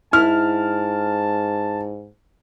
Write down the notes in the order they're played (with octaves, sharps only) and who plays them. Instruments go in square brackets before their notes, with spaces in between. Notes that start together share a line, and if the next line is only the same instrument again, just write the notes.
[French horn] G#2 [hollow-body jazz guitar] E4 [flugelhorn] A5 [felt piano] F6